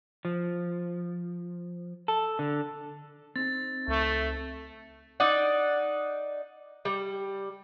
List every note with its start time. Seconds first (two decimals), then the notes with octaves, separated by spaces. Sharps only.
0.25 F3
2.08 A4
2.39 D3
3.36 C4 D#4 G#4 A6
3.88 C#2 A3
5.20 D#4 D5 F#5
6.85 G3